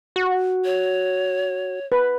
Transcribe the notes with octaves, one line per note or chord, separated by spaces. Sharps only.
F#4
C#5
B4